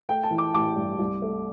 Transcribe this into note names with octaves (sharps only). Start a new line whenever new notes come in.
A3 G5
A5
E3
D6
A1 D6
G2
C2
A3